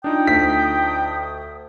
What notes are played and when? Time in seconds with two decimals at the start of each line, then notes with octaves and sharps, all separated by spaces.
0.04 D4 D#4 F4 G5 D#6
0.27 D2 B6